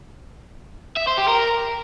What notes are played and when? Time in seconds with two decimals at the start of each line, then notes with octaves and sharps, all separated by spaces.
0.97 E5
1.07 C5
1.18 G4
1.28 A#4